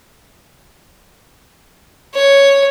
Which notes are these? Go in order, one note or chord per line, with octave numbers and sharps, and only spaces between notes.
C#5